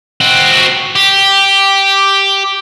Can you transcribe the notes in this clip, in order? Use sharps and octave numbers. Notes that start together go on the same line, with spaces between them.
C4 F#4
G4